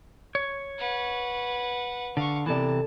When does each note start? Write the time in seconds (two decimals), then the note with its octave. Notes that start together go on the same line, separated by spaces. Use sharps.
0.35 C#5
0.79 B4 F#5
2.17 D3 F5 C#6
2.46 C3 E3 B3 A4 D5 A5